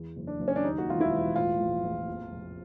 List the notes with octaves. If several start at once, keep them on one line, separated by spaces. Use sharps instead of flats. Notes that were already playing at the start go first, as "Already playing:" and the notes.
Already playing: E2
F#1
D4
F#1
C#4
D4
D#2 D#4
F#4
E1 F4
E4
E1
A2 F4
A#1
A#1
F2
F1